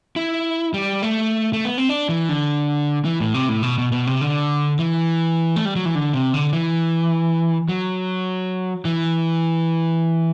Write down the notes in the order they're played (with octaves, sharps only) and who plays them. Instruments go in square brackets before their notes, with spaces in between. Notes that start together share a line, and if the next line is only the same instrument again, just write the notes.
[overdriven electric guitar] E4
G3
A3
A3
B3
C4
D4
E3
D3
E3
A2
C3
A2
B2
B2
B2
C3
D3
E3
A3
G3
F#3
E3
D3
C3
D3
E3
F#3
E3